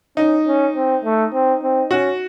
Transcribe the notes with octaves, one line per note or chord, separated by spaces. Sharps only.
C#4 D#4
C#4
C4
A3
C4
C4
C#4 F#4